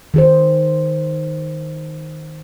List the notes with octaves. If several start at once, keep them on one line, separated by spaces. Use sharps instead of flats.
D#3 G#4 C5